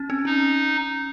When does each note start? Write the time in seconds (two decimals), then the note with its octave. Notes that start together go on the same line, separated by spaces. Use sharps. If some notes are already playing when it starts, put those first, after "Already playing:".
Already playing: C#4
0.10 C4
0.25 C#4 D#4